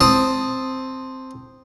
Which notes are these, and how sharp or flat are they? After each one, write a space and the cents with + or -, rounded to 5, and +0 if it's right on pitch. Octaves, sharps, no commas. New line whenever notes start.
C4 +0 A5 +0 D#6 -5